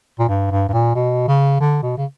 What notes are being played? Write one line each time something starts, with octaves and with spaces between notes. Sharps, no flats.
A#2
G2
G2
G2
A#2
B2
C#3
D3
B2
C#3